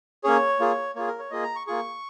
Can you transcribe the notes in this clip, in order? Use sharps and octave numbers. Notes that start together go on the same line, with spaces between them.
A#3 C#4 G#4 C#5
A#3 F4 G#4
A#3 F4 G#4 C#5
A#4
C#5
A#3 F4 G#4 D#5
A#5
C#6
A#3 F4 G#4 C#6